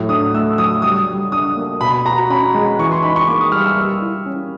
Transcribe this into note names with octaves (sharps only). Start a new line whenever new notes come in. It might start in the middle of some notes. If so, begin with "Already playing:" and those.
Already playing: A2 F#3
D4 D#6
A3 E6
F#3 D#6
G3 D#6
G3
D4 D#6
A#3
B2 B5
F#4 A#5
C#4 B5
G#3
E3 C#6
C6
D#4 B5
C#6
A#3 D6
D#6
G3 F6
E6
G3
E4
C#4